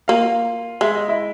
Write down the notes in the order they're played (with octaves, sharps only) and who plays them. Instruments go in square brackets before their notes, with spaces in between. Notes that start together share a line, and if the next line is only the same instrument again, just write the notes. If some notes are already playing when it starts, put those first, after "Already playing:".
[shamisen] A#3 [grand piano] F4 F5
[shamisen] G#3 [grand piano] E5
[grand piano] D#5
E4 E5